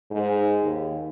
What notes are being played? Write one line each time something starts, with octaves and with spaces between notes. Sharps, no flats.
G#2
D#2